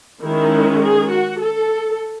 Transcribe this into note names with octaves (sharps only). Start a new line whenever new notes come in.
D#3 G#3 C#4 E4
G#4
F#4
A4